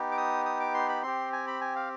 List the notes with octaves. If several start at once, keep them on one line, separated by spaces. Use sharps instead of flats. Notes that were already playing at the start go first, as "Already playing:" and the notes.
Already playing: B3 D#4 G4
D6
D#6
D#6
D6
C6
B5
C4 G4 C6
G#5
B5
G#5
F5